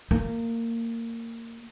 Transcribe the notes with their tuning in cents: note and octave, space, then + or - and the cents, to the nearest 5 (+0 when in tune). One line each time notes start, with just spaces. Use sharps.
A#3 -20